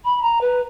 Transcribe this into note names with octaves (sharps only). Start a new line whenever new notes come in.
B5
A#5
B4